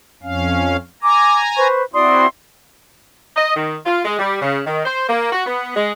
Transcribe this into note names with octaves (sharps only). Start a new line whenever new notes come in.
F2 C#4 F5
G#5 A#5 D6
B4 C5 C#6
C4 E4 F#4 D5 C6 D#6
D#5
D#3
F4
G#3
G3
C#3
D#3
C5
A#3
F#4
B3
G#3